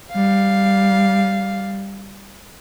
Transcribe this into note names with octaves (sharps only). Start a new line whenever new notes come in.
G3 F5